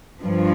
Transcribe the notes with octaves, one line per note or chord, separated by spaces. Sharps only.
G2 F3